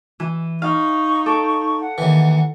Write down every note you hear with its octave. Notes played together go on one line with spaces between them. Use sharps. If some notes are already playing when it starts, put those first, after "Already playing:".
E3
D#4 F5 C#6
A4 D6
F#5
D#2 E3